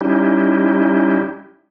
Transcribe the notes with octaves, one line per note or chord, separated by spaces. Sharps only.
G3 C#4 D#4 E4 G4